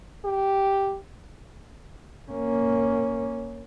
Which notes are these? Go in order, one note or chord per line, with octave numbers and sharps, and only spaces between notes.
G4
A#3 C#4